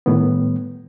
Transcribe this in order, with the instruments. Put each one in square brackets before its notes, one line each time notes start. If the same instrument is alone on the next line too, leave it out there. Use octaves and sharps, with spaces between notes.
[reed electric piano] A2 D#3 G3 B3